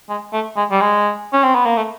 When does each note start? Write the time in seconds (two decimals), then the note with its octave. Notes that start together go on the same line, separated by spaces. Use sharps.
0.09 G#3
0.33 A3
0.56 G#3
0.71 G3
0.81 G#3
1.33 C#4
1.44 C4
1.55 B3
1.66 A#3
1.77 A3